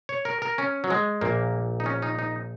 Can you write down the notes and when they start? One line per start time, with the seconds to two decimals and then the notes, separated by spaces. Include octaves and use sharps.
0.09 C#5
0.25 A#4
0.42 A#4
0.58 C#4
0.84 F#3
0.90 G#3
1.21 A#1 A#2 A#3
1.80 D#4
1.86 C#4
2.02 D#4
2.19 D#4